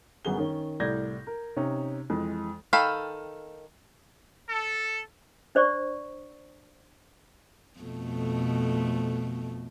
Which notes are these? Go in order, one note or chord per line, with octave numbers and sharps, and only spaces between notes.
G1 F#2 B3 G#4 G7
D#3 C#4
C2 A2 D5 G6 G#6 A#6
A#4
C3 C#4 D#4
F2 E3 G#3
D#3 A4 F5 G5 B5
A4
D4 C5 D5 C#6
F2 B2 A3